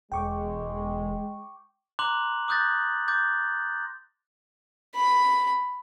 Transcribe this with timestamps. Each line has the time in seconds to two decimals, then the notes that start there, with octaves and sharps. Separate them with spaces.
0.12 E1 G#3 G5 C#6 D6
1.99 A#5 C6 D6 F#6 F#7
2.48 D6 D#6 F#6 G6 A6 A#6
3.08 D6 G6 A6
4.95 B5